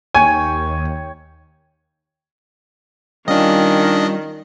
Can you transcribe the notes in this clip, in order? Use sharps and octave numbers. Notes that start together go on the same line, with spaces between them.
D#2 C#5 G5 G#5
D#3 G3 C#4 D4 F4 D#5